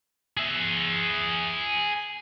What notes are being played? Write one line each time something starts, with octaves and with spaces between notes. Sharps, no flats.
G#4 E5